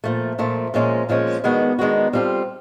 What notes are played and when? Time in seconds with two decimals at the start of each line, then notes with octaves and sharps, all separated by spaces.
0.04 A#2 F3 A3
0.39 A#2 F3 A3
0.74 A#2 F3 G#3 C#4
1.09 A#2 F3 G#3 C#4
1.44 D#3 G#3 B3 D4 F#4
1.79 D#3 G#3 B3 D4 F#4
2.13 G3 C4 F4 A4